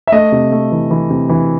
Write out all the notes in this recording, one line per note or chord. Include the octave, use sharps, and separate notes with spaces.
E5
A3 D#5
C3
A3
E3
E3
C3
E3